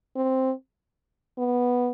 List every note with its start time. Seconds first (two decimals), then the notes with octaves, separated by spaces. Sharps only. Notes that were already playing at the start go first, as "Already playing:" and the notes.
0.16 C4
1.38 B3